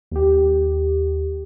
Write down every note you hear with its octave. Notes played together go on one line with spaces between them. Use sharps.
D#2 G4